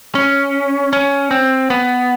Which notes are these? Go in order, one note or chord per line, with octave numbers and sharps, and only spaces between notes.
C#4
C#4
C4
B3